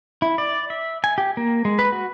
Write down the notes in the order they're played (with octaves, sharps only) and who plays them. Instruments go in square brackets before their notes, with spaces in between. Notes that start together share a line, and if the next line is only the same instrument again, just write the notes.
[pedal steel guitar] E4
D5
E5
G#5
G4
A#3
G#3
B4
F#4